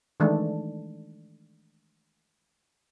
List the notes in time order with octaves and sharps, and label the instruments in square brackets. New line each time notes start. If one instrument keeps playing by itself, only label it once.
[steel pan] D#3 E3 G#3 A3 D4